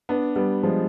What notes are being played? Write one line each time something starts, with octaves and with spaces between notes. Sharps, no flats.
B3 D4
G3 B3
F3 G#3